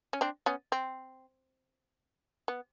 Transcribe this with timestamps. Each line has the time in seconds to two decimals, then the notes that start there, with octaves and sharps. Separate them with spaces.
0.13 C#4
0.21 C4 D4
0.46 B3 C#4
0.72 C4
2.48 B3